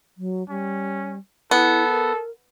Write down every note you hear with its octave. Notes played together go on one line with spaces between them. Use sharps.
F#3
G3 C#4
B3 E4 A4
A#4